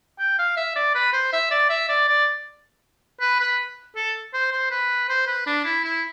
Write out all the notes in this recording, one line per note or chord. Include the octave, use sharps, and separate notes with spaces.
G5
F5
E5
D5
B4
C5
E5
D5
E5
D5
D5
B4
B4
A4
C5
C5
B4
C5
B4
D4
E4
E4